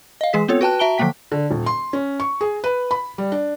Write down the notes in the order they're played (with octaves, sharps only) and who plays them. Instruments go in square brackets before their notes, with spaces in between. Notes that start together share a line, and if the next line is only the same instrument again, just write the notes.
[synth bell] D#5 F5
E3 G#3 G#4 B6
B3 C4 F4 A4 C#5
F#4 B4 G5 A5 F#6
F#4 E5 A5 A#5 D7 G7
D3 F3 F#3 A#3 G5 B6
[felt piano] D3
D#1
C6
C#4
C#6
G#4
B4
B5
G3
D4